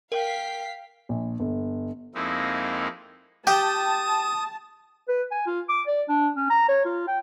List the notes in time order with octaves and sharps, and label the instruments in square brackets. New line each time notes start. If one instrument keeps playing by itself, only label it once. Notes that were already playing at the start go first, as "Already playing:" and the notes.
[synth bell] A#4 [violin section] F5 B6 C7 [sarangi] G5
[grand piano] A#1
G1
[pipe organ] F2 G#3 A#3 C4 D#4 E4
[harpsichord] G4 [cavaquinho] G5 [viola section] A5 [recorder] D#6
[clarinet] B4
G#5
F4
D6
D5
D4
C#4
A#5
C#5
F4
G5